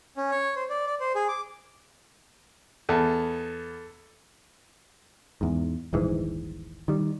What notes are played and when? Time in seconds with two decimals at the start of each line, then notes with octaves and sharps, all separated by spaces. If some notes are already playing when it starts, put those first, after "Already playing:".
0.17 C#4
0.31 C#5
0.56 C5
0.70 D5
0.87 D5
1.00 C5
1.15 G#4
1.28 D6
2.89 E2 A4
5.41 E2 G#2
5.93 D#1 A#1 G#2 E3
6.88 D#3 G3